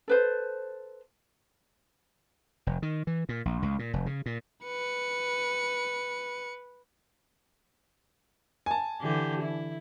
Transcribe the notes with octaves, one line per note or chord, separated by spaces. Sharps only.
A4 B4 C5
F1
D#3
E3
A#2
A#1
C#2
A#2
F1
C#3
A#2
B4 C#7
G#5 A5
D3 E3 G4
E4